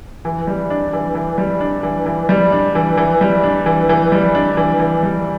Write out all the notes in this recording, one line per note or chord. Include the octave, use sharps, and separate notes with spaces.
E3
G3
D4
E3
E3
G3
D4
E3
E3
G3
D4
E3
E3
G3
D4
E3
E3
G3
D4
E3
E3
G3